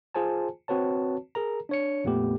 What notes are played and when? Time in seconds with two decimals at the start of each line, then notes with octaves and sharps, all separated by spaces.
0.15 F4 G#4 C5 G#5 A5
0.68 C4 F#4 B4 C#5 A5
1.35 G#4 A#4 A#5
1.69 D4 C#5 C#7
2.04 F2 A#2 A3 B3 G4